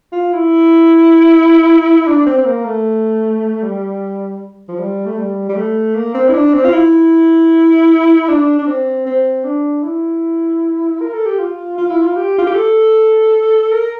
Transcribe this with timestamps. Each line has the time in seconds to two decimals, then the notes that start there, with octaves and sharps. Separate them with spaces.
0.13 F4
0.33 E4
2.07 D4
2.27 C4
2.38 C4
2.45 A#3
2.65 A3
3.63 G3
4.68 F3
4.79 G3
5.06 A3
5.18 G3
5.49 G3
5.56 A3
5.95 A#3
6.14 C4
6.29 E4
6.34 D4
6.53 C4
6.65 F4
6.73 E4
8.29 D4
8.58 D4
8.67 C4
9.06 C4
9.44 D4
9.84 E4
11.02 A#4
11.14 A4
11.26 G4
11.39 F4
11.78 F4
11.90 E4
12.02 F4
12.17 G4
12.39 F4
12.47 G4
12.55 A4
13.72 A#4